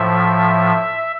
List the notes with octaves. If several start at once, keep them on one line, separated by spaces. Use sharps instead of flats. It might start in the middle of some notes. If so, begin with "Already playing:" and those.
Already playing: A2 F3 E5